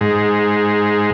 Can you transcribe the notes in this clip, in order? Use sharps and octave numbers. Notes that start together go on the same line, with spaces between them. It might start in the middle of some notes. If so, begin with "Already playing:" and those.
G#2